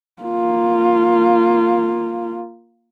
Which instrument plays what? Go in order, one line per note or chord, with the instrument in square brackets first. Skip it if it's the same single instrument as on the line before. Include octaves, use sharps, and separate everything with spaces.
[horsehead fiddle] A#3 F4